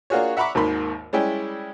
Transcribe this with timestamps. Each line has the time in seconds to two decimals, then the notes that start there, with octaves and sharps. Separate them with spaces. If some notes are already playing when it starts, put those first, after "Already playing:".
0.10 A#3 D4 F4 F#4 G#4 C#5
0.37 E5 F#5 A#5 B5 C#6 D6
0.55 G#1 D#2 G#2 A#3 B5 C6
1.13 G3 G#3 C#4 E4 G5